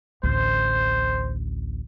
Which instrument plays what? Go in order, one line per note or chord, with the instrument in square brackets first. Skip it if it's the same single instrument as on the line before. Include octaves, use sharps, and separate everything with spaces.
[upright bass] A1 D2 [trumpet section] C5